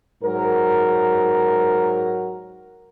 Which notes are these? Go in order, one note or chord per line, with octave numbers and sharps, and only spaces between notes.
G#2 F#3 A#4